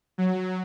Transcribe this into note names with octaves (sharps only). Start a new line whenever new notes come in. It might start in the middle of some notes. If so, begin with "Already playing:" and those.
F#3